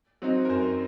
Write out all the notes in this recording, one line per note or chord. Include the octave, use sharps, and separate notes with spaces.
F#3 C4 D#4
A#4
F#2 C5